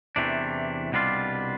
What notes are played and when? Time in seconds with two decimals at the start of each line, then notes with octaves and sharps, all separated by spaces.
0.16 E2 C3 E3 A3 D4
0.92 C2 B2 G3 D4 F4